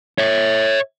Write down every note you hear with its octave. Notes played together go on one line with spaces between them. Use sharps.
C#5 E5